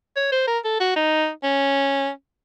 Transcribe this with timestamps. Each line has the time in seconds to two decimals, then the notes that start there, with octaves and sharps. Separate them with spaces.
0.16 C#5
0.32 C5
0.47 A#4
0.64 A4
0.80 F#4
0.96 D#4
1.43 C#4